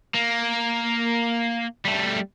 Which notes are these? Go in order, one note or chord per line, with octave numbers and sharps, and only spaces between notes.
A#3
G3 A3